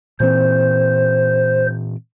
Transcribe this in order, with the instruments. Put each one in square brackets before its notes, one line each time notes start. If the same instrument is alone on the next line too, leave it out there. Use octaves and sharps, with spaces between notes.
[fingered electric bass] A#2 E3 C4 [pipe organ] C5